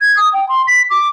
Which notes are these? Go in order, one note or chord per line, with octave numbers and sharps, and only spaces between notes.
G#6
D#6
G5
C6
B6
D6